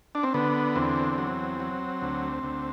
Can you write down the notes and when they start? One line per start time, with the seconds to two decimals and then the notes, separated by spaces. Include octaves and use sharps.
0.15 D4
0.23 C4
0.34 D3 B3
0.76 E2 C4
1.18 F#3
1.60 F#3
2.02 D2
2.43 D2